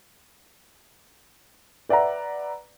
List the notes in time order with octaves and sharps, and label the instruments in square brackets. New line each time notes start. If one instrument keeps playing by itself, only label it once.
[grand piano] B4 D5 E5 F#5 A#5